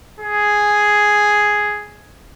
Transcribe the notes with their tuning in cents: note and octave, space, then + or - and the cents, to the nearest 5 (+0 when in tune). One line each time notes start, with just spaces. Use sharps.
G#4 +0